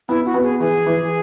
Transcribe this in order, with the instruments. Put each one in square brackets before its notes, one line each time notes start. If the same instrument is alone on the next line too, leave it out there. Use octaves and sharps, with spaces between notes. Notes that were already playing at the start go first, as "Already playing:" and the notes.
[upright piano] B3 [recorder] E4
[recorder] F#4
[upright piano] B3
[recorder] G#4
[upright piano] E3 [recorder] G#4
[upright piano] E3